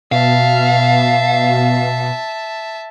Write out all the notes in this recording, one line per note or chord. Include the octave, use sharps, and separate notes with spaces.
B2 E5 F5 A5